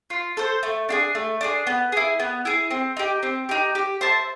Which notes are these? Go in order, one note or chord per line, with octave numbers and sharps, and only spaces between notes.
F4
A4 C5
A3
D4 F4 G#4
A3
D4 F4 G#4
B3
E4 G#4
B3
E4 G#4
C4
D#4 G4
C4
D#4 G4
G4
C5 E5 A5